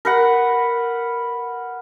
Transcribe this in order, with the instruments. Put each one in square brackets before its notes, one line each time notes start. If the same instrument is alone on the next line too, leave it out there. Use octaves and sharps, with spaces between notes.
[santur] A#4 B4 F#5